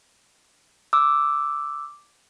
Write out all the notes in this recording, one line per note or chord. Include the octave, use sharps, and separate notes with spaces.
D6 E6